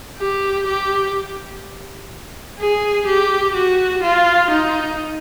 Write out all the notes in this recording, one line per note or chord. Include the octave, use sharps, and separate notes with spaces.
G4
G4
G#4
G4
F#4
F4
D#4